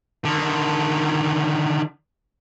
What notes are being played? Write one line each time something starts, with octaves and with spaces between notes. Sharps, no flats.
D3 D#3